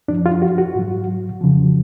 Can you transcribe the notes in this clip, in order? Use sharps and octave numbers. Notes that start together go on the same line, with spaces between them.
F#2 F3 D4
F4
F#4
F#4
G#2 F#3
F2 C#3 F3